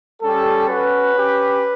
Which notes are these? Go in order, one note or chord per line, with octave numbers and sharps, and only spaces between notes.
G3 C#4 G4 A4
C#4 F#4 B4
C#4 G4